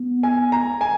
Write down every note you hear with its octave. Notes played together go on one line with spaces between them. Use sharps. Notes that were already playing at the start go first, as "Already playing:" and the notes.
Already playing: B3
G#5
A#5
G#5